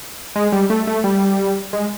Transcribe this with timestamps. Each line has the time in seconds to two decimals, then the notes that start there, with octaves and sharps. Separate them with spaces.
0.36 G#3
0.52 G3
0.70 A3
0.87 A3
1.04 G3
1.73 G#3